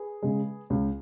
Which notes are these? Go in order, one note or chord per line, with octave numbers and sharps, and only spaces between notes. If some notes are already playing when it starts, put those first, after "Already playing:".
Already playing: G#4 B4
C#3 G#3
C#2